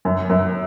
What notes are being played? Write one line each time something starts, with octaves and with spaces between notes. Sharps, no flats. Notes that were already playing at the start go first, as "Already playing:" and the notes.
F#2
F#2